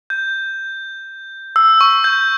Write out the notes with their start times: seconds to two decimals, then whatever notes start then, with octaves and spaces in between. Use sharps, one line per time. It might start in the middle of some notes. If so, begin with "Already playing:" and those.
0.10 G6
1.56 E6
1.81 C#6
2.04 G6